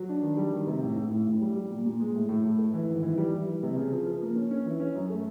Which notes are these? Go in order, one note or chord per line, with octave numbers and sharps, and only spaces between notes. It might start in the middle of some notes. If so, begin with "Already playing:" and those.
Already playing: F#3
D4
D#3
G3
D#3
C3
A1
A1
A2
A1
G3
G3
A#2
A#2
G#3
A2
A2
A2
A3
E3
G#1
E3
G3
E3
G3
C3
C#3
F3
F3
A#3
C#4
C#4
E3
C#4
F#2
A3